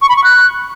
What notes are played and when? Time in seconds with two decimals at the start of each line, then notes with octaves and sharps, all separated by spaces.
0.02 C#6
0.09 B5
0.16 C#6
0.24 F#6